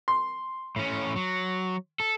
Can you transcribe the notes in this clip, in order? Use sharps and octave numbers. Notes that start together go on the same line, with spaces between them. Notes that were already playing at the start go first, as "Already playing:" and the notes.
C6
A2 C#4
F#3
A4